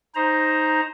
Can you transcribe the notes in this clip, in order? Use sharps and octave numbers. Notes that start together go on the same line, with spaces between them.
D#4 C5 A#5